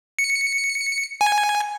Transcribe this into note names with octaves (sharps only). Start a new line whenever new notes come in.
C#7
G#5